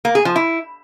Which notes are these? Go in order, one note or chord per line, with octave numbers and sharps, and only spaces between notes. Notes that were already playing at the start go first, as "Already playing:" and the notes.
A#3
G#4
F3
E4